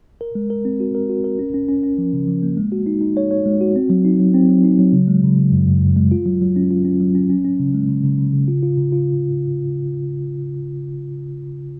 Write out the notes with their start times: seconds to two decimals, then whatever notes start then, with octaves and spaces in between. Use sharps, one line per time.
0.21 A#4
0.35 G#3
0.50 A#4
0.65 C4
0.80 F#4
0.95 A#4
1.10 F#4
1.24 A#4
1.39 C#4
1.54 C#4
1.69 C#4
1.84 C#4
1.98 F3
2.13 C#3
2.28 F3
2.43 A#3
2.57 G#3
2.72 F#4
2.86 D#4
3.01 D#4
3.17 C#5
3.31 C#5
3.45 G#3
3.61 F#4
3.76 C4
3.90 F#3
4.05 D#4
4.19 F#3
4.34 C4
4.49 F#3
4.64 D#4
4.79 F#3
4.93 C#3
5.08 G#3
5.23 C#3
5.38 C#3
5.52 F#2
5.67 F#2
5.82 F#2
5.97 G#3
6.11 F4
6.26 F#3
6.41 F#3
6.56 C#4
6.71 F4
6.85 C#4
7.00 F#3
7.15 C#4
7.30 C#4
7.45 C#4
7.59 C#3
7.75 G#3
7.89 C#3
8.04 C#3
8.19 C#3
8.33 C#3
8.48 F4
8.63 F4
8.77 C#3
8.92 F4